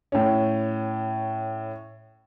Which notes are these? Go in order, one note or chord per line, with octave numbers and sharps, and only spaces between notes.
A2 C#4